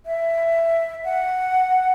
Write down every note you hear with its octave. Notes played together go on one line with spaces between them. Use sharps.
E5
F#5